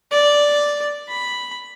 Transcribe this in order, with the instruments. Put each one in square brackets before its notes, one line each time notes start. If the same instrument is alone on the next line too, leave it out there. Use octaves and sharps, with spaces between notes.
[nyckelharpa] D5
B5